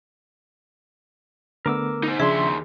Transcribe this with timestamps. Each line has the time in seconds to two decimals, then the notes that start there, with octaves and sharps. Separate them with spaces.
1.66 D3 A3 B3 A#4 D6 E6
2.03 D#4 C5
2.20 D#2 C#3 F3 D4 G#4 E5 C6